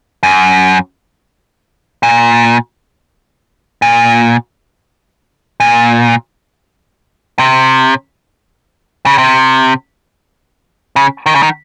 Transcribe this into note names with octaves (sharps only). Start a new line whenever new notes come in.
F#2
A#2
A#2
A#2
C3
C#3
C3
C#3
D#3
C#3
D#3